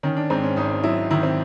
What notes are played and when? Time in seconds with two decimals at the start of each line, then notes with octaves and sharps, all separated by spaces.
0.03 D#3 C#4
0.16 D4
0.30 G#2 C4
0.43 C#4
0.56 G#1 D#4
0.83 F#3 E4
1.11 D#3 E4
1.23 C4